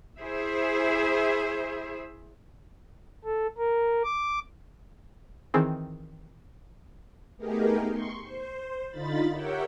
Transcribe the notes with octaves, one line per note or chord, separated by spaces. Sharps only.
E4 G#4 C5 E5
A4
A#4
D6
D#3 E3 C4 G#4
A3 B3 D#4 G4 G#4 A#4
C6 C#6
C5
D3 D#4 F4 B5 A6
G4 A#4 C#5 E5 F#5 G5